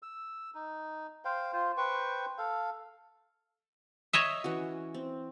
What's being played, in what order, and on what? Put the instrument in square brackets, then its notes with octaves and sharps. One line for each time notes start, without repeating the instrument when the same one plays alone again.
[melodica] E6
D#4
C5 F5 G5
F4 C5
B4 C5 G5 C#6
A4 F5
[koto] C#5 D#5 E5
[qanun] E3 C#4 F#4
C4